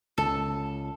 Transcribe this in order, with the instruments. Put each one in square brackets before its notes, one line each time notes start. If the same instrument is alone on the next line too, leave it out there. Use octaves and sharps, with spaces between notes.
[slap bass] C#2 [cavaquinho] A4